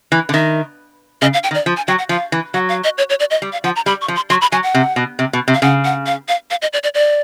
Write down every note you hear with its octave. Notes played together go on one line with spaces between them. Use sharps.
E3
D3
D#3 E5
C#3 D#5
F5
G5
D#3
D5
F3
G#5
F#3 G5
F#5
F3 F5
E3
F#3 F#5
F5
D#5
C#5
C#5
D5
D#5
G3
F5
F3 F#5
A#5
G3 B5
C#6
F3
C6
F#3 C6
B5
F#3 G#5
F#5
C3
B2
C3
B2
C3
F5
C#3 F#5
F#5
F5
F5
F5
D#5
D5
D5
D5